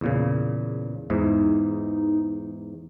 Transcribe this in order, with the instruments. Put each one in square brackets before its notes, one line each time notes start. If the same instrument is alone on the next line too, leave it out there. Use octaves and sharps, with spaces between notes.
[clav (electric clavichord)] E2 A#2 C#3
[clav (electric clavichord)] E2 G#2 E3 [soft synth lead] D#4